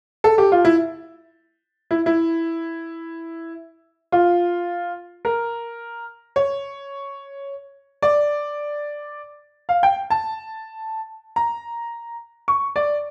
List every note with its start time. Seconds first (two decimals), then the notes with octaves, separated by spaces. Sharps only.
0.24 A4
0.38 G4
0.52 F4
0.65 E4
1.91 E4
2.06 E4
4.12 F4
5.25 A#4
6.36 C#5
8.02 D5
9.69 F5
9.83 G5
10.10 A5
11.36 A#5
12.48 C#6
12.76 D5